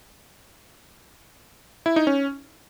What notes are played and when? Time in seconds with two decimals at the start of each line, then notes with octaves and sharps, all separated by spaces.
1.86 E4
1.96 D#4
2.07 C#4